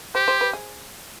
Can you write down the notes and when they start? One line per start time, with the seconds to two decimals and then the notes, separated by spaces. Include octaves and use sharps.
0.15 G4 C5
0.28 C5
0.41 B4
0.53 G#4